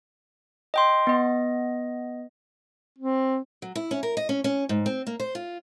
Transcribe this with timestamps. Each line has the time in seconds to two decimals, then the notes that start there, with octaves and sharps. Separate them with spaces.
0.74 D#5 G5 C6
1.07 B3 D#5
2.99 C4
3.62 F#3
3.75 E4
3.91 C#4
4.03 A#4
4.17 D#5
4.29 C#4
4.44 C#4
4.69 G#2
4.86 C4
5.07 A#3
5.20 C5
5.35 F4